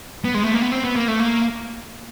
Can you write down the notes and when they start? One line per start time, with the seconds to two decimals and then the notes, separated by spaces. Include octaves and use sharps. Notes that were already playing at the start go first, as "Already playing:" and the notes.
0.25 B3
0.34 G#3
0.44 A3
0.54 A#3
0.62 B3
0.72 C4
0.84 B3
0.96 A#3
1.08 A3
1.19 A#3